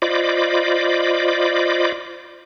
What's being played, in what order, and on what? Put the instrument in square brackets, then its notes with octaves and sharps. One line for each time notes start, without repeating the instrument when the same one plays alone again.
[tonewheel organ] F4 C5 D5 D#5 B5 D6